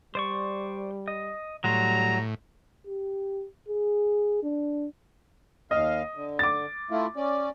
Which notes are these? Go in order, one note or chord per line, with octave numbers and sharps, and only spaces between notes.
G3 C5 D5 C#6
D#5
A2 F#3 G3 A#5 C6
G4
G#4
D4
D#2 D#5 F5
D3
D6 A6
A3 E4 F4
C#4 D5